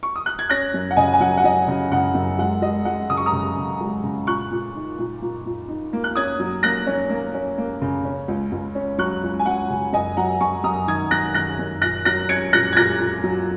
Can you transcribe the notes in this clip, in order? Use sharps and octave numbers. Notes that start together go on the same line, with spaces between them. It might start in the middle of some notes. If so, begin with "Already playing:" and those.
C#6
D#6
F#6
G#6
C#4 F#6 A#6
F#2
F#5
C#3 D#5 G#5
G#5
F#3 F#5
F#5
F#3 D#5
C#3
C#3 F#5
F#2
G#3 F#5
G#3 D#5
G#3 F#5
C#3 D#6
C#6
A#5 D#6
C#3
C#3
G#3
C#3
A#2 C#6 F#6
A#2
D#4
A#2
A#2
A#2
D#4
A#3
F#6
C#4 D#6 G#6
F#3
A#3 F#6 A#6
C#4
A#3
C#4
A#3
C#3
C#4
C#2
C#2
C#4
F#3 C#6 F#6
C#2
G#5
F#3 F#5
C#3
F#2 D#5 G#5
F#3 F#5 A#5
F#2 G#5 C#6
F#2 A#5 D#6
D#3 D#6 G#6
F#2 F#6 A#6
D#3 F#6 A#6
F#2
A#2 F#6 A#6
F#3 F#6 A#6
C#4 G#6 C#7
A#2 F#6 A#6
G#6
A#2 F#6 A#6
A#2
F#3